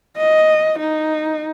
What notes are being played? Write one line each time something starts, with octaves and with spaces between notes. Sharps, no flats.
D#5
D#4